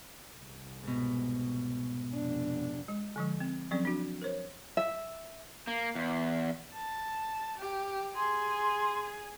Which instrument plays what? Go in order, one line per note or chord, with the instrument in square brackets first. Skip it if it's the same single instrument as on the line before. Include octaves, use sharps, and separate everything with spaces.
[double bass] C2
[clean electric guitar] G#2 B2
[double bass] F1 D4
[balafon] G#3
D3 F3 G#3
C4
F3 F#3 C4 C#4 A4 D5
D4 F#4
A#4 C5 C#5
[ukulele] E5
[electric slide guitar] A#3
E2
[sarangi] A5
G4
[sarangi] G#4 [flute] C6